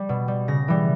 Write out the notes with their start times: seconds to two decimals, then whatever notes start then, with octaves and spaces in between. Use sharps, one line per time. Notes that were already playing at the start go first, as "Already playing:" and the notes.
Already playing: G3
0.09 B2
0.28 G3
0.48 C#3 A#6
0.68 E3 G3